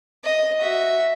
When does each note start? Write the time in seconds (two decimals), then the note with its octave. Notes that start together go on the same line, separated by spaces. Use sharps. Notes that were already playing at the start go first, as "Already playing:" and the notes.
0.24 D#5
0.60 F#4 E5